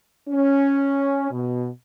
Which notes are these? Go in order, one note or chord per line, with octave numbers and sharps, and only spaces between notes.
C#4
B2